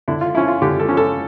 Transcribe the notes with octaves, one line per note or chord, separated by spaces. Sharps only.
D3 E4
F4
F3 C#4 E4
F4
D3 G4
A4
F3 C#4
A4